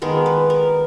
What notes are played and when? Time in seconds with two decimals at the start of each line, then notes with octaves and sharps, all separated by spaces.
0.02 D#3 G#3 B3 A#4
0.26 B4
0.50 A#4